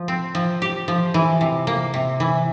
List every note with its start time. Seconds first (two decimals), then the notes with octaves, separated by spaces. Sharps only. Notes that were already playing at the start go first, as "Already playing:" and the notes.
Already playing: F3
0.08 C4
0.35 F3
0.62 G4
0.88 F3
1.14 E3
1.41 C3
1.67 A#3
1.94 C3
2.20 E3